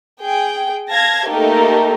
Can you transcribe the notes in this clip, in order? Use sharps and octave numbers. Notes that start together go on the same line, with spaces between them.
G#4 G5
F5 A5 G#6 A#6
A3 A#3 D#4 G4 A4 A#4